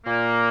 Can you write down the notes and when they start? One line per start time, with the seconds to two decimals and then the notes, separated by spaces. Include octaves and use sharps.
0.06 A#2 A#3